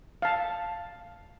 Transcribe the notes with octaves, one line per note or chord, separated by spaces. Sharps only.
F5 A5